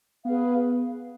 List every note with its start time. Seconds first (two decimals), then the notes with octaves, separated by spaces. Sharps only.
0.25 B3 G#4 B4 F5